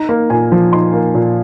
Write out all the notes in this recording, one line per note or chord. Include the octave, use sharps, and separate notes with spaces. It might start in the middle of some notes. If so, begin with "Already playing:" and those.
Already playing: D#4 A#5
A#3
A#2 G#5
F3
D#4 C6
A#3
A#2